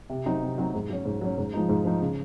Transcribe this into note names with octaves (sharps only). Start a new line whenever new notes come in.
C3
F#3 C4 D#4
C3
F#3 C4 D#4
G#2
F#3 C#4
G#2
F#3 C#4
G#2
F3 G#3 D#4
G#2
F3 G#3 D#4
C#3